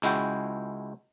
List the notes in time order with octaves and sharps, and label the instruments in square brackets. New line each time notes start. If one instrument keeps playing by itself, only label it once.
[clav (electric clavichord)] C#2 G#3 E4 F#4 G5